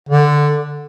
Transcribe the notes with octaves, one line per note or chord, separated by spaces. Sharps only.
D3